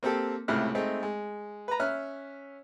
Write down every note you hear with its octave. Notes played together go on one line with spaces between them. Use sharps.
A#3 C4 G4 A4
C#2 A2 C3 A3 F6 F#6
G#3 A3 C4 D#4
G#3
B4 A#5
C#4 E5 F6 F#6